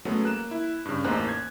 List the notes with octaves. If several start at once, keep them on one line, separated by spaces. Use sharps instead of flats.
F#3 G#3 A3 B3 C#4
A#3 F#6 E7
E4
G2 C#3
A1 E2 A#3 D#4 C5 F#6
G#6